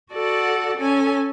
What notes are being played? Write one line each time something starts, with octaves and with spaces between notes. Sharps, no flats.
F#4 A4 D5 F#5
C#4 A4 G#5